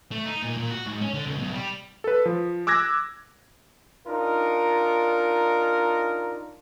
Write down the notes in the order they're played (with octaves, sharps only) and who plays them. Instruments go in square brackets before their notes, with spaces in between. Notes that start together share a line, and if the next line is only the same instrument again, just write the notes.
[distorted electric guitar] A3
D#4
A#2
A#2
F#4
G#2
C#4
D3
C#2
B1
G3
[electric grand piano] A4 B4
F3
D6 E6 F#6 G#6 A#6
[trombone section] D4 D#4 F4 A#4